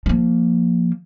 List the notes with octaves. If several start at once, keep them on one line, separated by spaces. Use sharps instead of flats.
F3 A#3